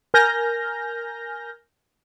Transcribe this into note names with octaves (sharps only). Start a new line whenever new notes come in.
A#4 G#5 F6 G6 A#6